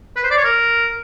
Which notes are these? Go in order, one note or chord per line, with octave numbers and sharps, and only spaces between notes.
B4
C5
D5
C#5
A#4